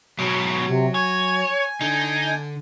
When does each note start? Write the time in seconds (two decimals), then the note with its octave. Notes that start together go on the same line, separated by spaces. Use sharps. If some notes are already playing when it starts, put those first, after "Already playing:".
0.19 G#2 B2 F#3
0.67 C3
0.94 C#5 G#5
1.81 D3 D#4